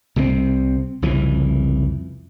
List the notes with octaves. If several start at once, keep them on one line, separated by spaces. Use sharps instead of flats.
C2 C3 G3 C4
C2 F2 C#3 E3